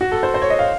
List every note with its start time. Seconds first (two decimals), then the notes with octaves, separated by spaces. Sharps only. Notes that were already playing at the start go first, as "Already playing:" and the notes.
0.01 F#4
0.12 A4
0.23 C5
0.34 C5
0.42 C#5
0.50 D#5
0.59 F5